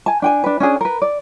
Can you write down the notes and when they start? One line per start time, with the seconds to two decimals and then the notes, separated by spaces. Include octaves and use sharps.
0.06 G#5 A5
0.22 D4 G5 G#5
0.44 D4 B4
0.60 C#4 D4 G#4
0.81 A#4 B4
1.02 D5